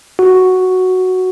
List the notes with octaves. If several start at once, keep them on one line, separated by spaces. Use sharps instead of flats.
F#4